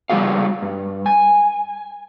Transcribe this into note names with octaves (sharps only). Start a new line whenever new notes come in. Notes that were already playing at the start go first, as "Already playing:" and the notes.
C#3 G3 A#3 F#4 G#4 F5
G2
G#5